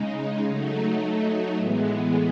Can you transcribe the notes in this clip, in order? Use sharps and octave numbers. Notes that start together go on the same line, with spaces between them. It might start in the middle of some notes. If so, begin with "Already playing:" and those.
Already playing: C#3 G#3 D#4
F#3 A3 D#4
A2 E3 G#3 B3